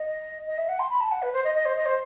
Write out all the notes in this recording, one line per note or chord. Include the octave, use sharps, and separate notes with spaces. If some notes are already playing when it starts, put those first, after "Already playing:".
Already playing: D#5
D#5
E5
F#5
C6
B5
A5
F#5
B4
C5
D#5
D#5
C5
D#5
C5